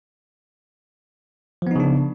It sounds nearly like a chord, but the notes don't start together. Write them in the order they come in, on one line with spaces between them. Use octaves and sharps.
F3 B3 D#4 C#3 D4